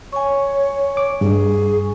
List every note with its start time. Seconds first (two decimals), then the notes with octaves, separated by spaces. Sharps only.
0.12 C#5 G#5 C#6
0.97 D6
1.21 G2 G#4